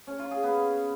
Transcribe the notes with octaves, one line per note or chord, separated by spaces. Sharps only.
C#4
F4
G#4
B3